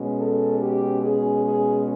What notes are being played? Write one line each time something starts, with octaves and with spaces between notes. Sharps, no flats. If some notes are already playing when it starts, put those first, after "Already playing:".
Already playing: B2 G#3 C#4
A4
G4
G#4
G#4